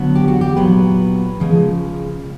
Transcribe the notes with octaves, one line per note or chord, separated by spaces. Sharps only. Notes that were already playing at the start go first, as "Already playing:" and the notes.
Already playing: D3 F#3 B3
G4
F#4
G4
A#2 F#3 B3 B4
C#3 F3 G#3